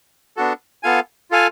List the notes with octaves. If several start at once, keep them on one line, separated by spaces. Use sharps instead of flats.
B3 D4 F#4 A4
B3 F4 A4 F5 G#5
F4 A4 F5 G#5